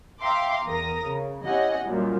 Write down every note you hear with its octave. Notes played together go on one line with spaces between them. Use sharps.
E5 F5 G5 A#5 C6 D6
E2 A#4 D#6 A#6
C#3
C#4 E4 G4 D#5 F#5 G#5
F#2 A#2 G3